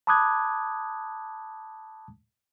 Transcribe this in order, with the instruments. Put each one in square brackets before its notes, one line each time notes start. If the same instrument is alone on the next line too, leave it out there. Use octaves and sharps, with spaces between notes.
[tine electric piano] A5 B5 D6 D#6 F#6 G#6